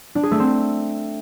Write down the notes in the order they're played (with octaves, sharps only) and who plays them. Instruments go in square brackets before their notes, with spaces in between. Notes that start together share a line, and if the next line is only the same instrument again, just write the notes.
[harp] D4
G#4
A3
C4